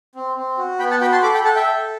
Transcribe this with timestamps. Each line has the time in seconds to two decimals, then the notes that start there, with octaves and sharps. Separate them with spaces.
0.15 C4
0.36 C4
0.58 F#4
0.79 B3 G5 B5
0.90 F#5 A5
1.01 F#4 G5 B5
1.12 A5 C6
1.22 A4 B5 D6
1.33 G5 B5
1.44 A4 F#5 A5
1.55 E5 G5
1.66 A4